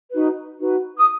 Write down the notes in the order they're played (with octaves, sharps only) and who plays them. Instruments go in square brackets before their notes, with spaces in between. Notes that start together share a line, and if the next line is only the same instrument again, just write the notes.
[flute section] D#4 F#4 B4
D#4 F#4 B4
D#6